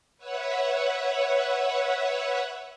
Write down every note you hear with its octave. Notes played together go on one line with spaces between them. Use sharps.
B4 C#5 E5 F#5